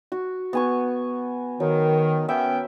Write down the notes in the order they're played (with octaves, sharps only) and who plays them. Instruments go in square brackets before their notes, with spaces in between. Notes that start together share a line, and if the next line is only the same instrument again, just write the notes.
[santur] F#4
B3 G#5 C#6
[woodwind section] D#3 [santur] F#3
[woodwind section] B3 C#4 G5 [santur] E5